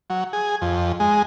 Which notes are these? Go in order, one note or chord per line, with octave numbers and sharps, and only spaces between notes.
F#3
G#4
F2
G#3